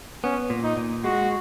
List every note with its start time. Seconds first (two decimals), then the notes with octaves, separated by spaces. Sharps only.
0.24 B3 C#4
0.50 A#2
0.64 D#4
0.77 A#2
1.04 G#3 F#4